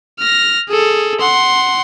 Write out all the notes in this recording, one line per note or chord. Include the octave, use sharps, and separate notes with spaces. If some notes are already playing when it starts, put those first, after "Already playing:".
F6 A#6
G#4 A4
F#5 C6